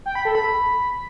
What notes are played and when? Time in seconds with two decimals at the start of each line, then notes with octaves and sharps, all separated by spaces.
0.06 G5
0.15 B5
0.25 A4
0.35 B5